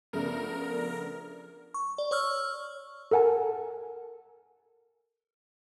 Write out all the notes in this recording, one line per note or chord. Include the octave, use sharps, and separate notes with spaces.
C#3 F3 A3 B3 D4 A#4
C#6
D5
C#5 C#6 E6 F6
A4 A#4 F#5 G#5 A5